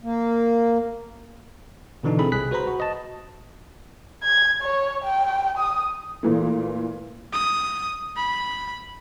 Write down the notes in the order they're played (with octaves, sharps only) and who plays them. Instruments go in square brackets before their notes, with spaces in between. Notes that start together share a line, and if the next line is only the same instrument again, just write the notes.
[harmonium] A#3
[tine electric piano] B2 D3 E3 D4 D#4
C4 E4 G#4 A4 B5
C2 G#4 F#6 B6
F#4 B4 C5 A#5 B5
F#4
D#5 A5
[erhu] G#6
C#5
G5
D#6
[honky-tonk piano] A#2 E3 A3
[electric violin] D#6
B5